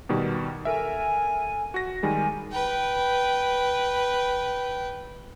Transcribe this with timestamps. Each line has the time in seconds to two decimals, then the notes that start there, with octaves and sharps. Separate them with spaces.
0.09 B2 D#3 G3
0.65 A4 A#4 E5 G#5
1.74 F#4 A#6
2.03 D#3 G3 G#3 G#5
2.52 B4 G5